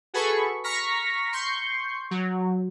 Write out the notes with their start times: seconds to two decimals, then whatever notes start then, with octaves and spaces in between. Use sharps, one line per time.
0.14 F#4 G#4 A4 B4 B5 C#6
0.64 A#5 C#6 F6 A#6 B6
1.33 C6 C#6 G6
2.11 F#3